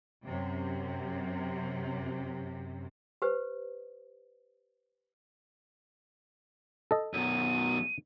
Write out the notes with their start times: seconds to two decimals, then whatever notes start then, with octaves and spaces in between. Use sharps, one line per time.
0.23 F#2 C3
3.22 G4 B4 C5
6.91 A4 D#5
7.13 F#2 B2 D#7